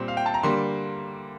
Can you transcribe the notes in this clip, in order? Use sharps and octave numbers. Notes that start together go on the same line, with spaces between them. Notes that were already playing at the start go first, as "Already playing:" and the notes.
Already playing: A#2 G3 C4
F5
G5
A5
A#5
D3 G3 A#3 C6